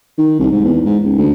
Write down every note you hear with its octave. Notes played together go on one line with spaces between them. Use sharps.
D#3
C2
G#2
E2
G#2
C#2
D2